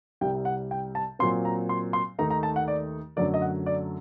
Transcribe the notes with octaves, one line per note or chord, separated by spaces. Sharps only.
C2 C3 G3 G5
F#5
G5
A5
A#2 F#3 C4 C6
A#5
C6
C6
D#2 D#3 A3 D#4 A#5
A#5
A5
F#5
D5
F#2 D3 F#3 A3 D5
D#5
F#5
D5